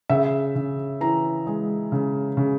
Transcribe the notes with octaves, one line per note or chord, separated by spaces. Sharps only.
C#3 E5
C#3
E3 A#5
G#3
C#3
C#3